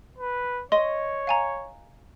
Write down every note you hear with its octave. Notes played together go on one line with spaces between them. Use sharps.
B4
C#5 D#5 C6
F5 G#5 A#5